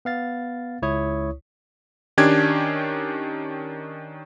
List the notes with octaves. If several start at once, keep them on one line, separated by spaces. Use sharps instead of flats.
B3 F5 A6
C#2 E4 C#5 C#6 D#6
D#3 C#4 D4 G4 G#6